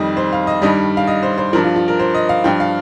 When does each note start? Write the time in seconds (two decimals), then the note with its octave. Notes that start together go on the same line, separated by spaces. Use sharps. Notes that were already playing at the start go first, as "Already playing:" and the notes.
Already playing: F2 D#3 G3 D#5
0.17 C5
0.33 F5
0.47 D#5
0.62 G2 D#3 G3 D#5
0.97 F5
1.07 D#5
1.23 C5
1.38 C5
1.53 F3 A#4
1.56 G2
1.64 F4
1.76 F4
1.88 A#4
1.99 C5
2.15 D#5
2.29 F5
2.44 G2 F3 G5
2.60 F5